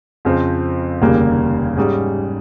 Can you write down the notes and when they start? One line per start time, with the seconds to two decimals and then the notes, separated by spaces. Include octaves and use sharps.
0.25 F2 C#3 F3 C4
1.01 F1 D#2 C#3 G3 A#3
1.77 G#2 G3 C#4 G#4